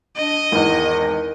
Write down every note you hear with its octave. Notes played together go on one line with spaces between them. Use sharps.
D4 D#5
G#1 E2 A#4